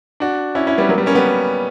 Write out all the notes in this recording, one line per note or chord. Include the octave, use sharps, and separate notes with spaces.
D4 F#4
C#4 E4
C#4 E4
G3 B3
F#3 A#3
G3 B3
A#3 C#4
G3 B3